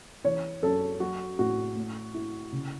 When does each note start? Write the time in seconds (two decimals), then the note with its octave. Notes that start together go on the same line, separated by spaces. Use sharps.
0.24 E3 C#5
0.63 F#2 A4
1.00 F#3 F#4
1.39 A2 F#4
1.76 A3
2.14 E4
2.52 C#3